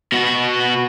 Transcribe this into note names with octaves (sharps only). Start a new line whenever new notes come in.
B2 F#4